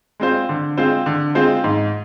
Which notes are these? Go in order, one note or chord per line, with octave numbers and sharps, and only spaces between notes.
G#3 C4 F4 C5
D3
G#3 C4 F4 C5
D3
G#3 C4 F4 C5
G#2